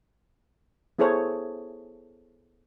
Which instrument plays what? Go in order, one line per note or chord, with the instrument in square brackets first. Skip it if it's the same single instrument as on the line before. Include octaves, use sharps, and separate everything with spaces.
[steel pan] B3 E4 G#4 A4 C5 C#5